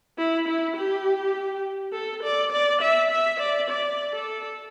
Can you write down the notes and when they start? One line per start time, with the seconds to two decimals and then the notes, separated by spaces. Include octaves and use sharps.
0.18 E4
0.48 E4
0.76 G4
1.93 A4
2.23 D5
2.52 D5
2.82 E5
3.11 E5
3.40 D5
3.70 D5
4.14 A4